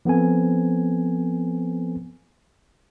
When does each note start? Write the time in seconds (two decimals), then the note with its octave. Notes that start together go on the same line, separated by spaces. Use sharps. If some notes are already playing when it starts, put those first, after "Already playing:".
0.05 F3 B3 C4 A4 G#5